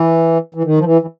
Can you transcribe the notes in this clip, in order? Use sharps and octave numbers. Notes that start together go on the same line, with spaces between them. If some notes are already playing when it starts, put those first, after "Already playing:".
Already playing: E3
E3
D#3
F3
E3
E3